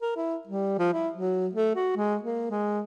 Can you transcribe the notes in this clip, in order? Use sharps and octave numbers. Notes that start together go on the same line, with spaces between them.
A#4
E4
G3
F3
E4
F#3
A3
F#4
G#3
A#3
G#3